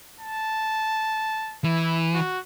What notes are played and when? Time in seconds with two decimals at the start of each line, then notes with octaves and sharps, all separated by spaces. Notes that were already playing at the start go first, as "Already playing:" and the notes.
0.20 A5
1.64 E3 E4
2.14 F#4